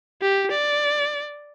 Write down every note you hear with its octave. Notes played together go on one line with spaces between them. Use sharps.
G4
D5